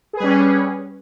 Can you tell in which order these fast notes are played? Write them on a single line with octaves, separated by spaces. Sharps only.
G#4 B4 G3 C#4